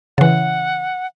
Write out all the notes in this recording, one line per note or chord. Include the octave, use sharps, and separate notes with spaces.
C#3 E3 F#5